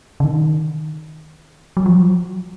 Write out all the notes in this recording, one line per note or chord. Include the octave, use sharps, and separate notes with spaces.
C#3
D#3
F#3
F3
F#3